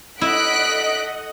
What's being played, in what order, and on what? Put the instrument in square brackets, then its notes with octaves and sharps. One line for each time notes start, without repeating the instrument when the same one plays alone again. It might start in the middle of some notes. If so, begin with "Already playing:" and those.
[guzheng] E4 [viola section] A4 D#5 F#5 [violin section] F#6 B6 D7